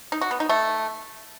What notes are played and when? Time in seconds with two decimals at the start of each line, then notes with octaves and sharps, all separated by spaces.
0.12 D#4
0.21 F#4
0.31 B3
0.40 D#4
0.49 A3